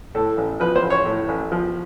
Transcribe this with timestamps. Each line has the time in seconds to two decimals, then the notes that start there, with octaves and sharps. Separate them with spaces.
0.15 A2 A4
0.37 A1
0.60 F3 B4
0.75 C5
0.83 A1
0.90 C#5
1.05 A2
1.28 A1
1.52 F3